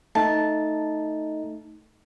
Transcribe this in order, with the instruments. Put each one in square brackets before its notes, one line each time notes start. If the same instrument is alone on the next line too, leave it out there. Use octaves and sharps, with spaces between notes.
[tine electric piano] A3 D#4 [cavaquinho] A5